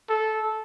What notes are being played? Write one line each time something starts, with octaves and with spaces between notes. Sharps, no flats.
A4